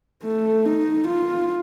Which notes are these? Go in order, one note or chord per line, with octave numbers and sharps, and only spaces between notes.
A3
D#4
F4